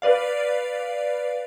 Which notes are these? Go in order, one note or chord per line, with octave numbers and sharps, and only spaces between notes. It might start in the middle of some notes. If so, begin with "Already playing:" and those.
B4 D5 F5